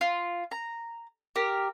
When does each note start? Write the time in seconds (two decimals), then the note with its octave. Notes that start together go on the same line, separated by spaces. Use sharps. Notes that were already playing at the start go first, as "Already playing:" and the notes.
0.01 F4
0.51 A#5
1.36 G4 A#4